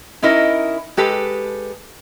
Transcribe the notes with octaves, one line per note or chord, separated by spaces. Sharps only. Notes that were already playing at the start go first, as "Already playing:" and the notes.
C#4 D#4 E4 A#4 D#5
G#3 G4 A4 B4